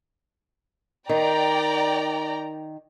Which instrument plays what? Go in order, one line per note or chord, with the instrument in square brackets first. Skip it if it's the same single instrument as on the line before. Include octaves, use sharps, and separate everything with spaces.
[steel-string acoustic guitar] D#3 [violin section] D5 G5 A#5